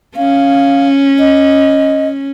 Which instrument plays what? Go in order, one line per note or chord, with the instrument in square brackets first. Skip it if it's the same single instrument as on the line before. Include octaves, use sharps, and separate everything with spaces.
[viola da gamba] C#4 [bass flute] F5
[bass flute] D#5